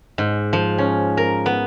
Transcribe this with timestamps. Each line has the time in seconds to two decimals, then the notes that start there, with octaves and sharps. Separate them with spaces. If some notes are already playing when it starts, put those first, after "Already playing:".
0.18 G#2
0.53 F3
0.78 C#4
1.17 A#4
1.46 B3